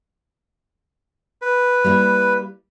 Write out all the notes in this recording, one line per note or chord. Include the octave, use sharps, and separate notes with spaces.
B4
G3 A#3 E4